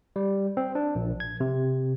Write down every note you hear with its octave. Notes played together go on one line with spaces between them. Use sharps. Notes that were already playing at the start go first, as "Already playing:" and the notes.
G3
C4
D4
A#1
G#6
C3